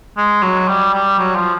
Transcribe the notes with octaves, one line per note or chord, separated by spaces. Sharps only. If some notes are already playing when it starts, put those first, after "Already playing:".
G#3
F#3
G3
G3
F#3
F3